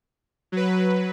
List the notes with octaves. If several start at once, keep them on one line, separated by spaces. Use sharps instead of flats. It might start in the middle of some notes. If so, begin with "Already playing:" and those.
F#3 B4